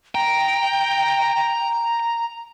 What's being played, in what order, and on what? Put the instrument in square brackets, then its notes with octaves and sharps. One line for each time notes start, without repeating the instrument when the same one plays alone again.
[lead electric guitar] G5 [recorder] A#5